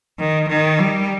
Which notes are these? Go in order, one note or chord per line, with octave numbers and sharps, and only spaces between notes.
D#3
D#3
G3